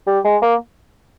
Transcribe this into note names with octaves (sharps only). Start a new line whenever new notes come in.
G3
G#3
A#3